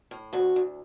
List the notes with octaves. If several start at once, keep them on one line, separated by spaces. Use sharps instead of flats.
A2
D2 F#4
D2